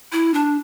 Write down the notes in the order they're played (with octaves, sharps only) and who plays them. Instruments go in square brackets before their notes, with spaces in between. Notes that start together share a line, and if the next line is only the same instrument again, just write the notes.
[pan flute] E4
D4